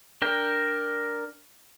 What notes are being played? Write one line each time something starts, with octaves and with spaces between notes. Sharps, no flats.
D4 A#4 G5